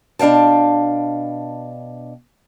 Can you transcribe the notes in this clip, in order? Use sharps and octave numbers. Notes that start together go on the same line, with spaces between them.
B2 D4 F5 G5 A5